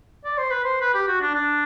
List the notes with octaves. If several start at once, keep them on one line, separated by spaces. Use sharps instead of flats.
D5
C5
B4
C5
B4
G4
F#4
D4
D4